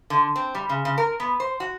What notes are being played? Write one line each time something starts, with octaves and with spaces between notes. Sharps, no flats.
D3
C4
G3
C#3
C#3
A#4
B3
C5
F#4